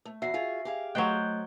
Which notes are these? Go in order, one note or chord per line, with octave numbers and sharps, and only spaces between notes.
A3
E2 F#4 E5 C7
F4 F#4 G#4
G4 G#4 F5
F#3 A3 C5 D#5 G5 F#6